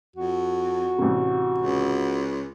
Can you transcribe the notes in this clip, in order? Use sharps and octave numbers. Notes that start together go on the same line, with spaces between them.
F2 F#4
A1 C3
C#2